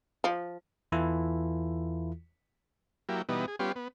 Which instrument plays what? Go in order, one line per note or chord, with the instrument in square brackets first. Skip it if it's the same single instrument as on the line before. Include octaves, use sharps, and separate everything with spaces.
[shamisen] F3
[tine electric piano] E2 E3 E4 F4 A4
[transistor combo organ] F#3 A#3 E4 G4
B2 E3 G3 B3 D#4
G#4
G3 B3 C#4 F4 G4 C6
B3